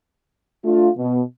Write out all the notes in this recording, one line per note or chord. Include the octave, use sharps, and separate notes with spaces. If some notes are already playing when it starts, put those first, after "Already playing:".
A3 D4 F4
B2